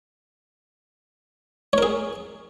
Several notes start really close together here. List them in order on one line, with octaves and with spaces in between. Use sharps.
C#5 A#4 G#4